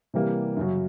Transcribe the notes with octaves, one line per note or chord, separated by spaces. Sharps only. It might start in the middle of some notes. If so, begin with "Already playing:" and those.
C3 E3 G3 A#3
F#2 C#3 F#3